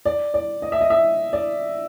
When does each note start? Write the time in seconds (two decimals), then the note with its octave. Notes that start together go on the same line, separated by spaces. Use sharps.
0.06 D5
0.34 D5
0.62 D#5
0.72 E5
0.81 D#5
0.90 E5
1.33 D5